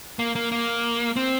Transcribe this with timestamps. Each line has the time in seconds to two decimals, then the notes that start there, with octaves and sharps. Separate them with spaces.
0.19 A#3
0.35 A#3
0.52 A#3
1.16 C4